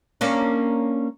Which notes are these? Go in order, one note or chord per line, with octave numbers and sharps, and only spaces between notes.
A#3 C#4 D4